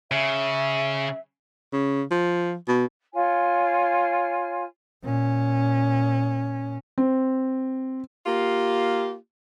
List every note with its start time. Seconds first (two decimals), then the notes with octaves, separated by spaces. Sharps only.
0.12 C#3 E5
1.73 C#3
2.11 F3
2.68 B2
3.14 F4 C#5 G#5
5.03 A#2 C#4
6.98 C4
8.27 A#3 F4 G4